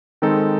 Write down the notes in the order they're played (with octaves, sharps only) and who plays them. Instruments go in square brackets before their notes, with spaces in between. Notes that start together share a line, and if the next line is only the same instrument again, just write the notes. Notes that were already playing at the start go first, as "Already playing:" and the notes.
[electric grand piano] D#3 G#3 C4 D#4 A4